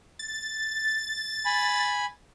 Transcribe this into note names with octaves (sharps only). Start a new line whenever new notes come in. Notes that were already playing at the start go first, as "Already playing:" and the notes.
A6
G#5 B5